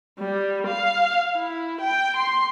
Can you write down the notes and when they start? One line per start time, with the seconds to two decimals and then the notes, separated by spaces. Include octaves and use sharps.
0.19 G3
0.66 F5
1.36 E4
1.81 G5
2.16 C6